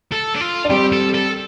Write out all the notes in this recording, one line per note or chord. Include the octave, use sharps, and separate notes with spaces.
A4
D4
F4
D4
G3 C4 G4
A4
A4